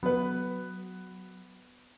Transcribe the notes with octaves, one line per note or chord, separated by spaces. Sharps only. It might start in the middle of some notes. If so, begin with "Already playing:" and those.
F#3 B3 B4